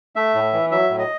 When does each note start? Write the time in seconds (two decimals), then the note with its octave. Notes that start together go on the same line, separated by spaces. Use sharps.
0.16 A3 E5
0.34 A2
0.53 E3
0.71 F#3 E5
0.89 A2
0.99 D#5